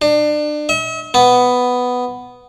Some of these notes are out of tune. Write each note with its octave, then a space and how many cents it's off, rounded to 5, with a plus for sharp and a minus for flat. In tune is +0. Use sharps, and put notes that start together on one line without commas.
D4 +30
E5 -45
B3 +5